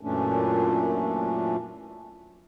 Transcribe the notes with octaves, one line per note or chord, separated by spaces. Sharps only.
F#2 A#2 E3 A3 C#4 D4